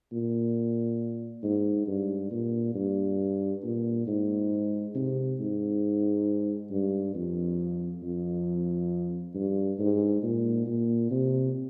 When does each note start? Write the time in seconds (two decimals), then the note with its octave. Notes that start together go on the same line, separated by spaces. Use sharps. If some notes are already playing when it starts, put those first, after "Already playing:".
0.12 A#2
1.43 G#2
1.87 G2
2.31 A#2
2.75 G2
3.64 A#2
4.07 G#2
4.95 C3
5.40 G#2
6.71 G2
7.15 F2
8.02 F2
9.35 G2
9.79 G#2
10.23 A#2
10.66 A#2
11.11 C3